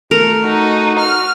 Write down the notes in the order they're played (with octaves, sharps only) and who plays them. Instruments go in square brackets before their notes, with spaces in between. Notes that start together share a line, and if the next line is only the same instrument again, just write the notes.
[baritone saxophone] A3 [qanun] A#4
[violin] D#4 [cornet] F#4
[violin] F6